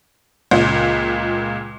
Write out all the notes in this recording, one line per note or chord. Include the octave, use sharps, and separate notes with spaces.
C#2 A#2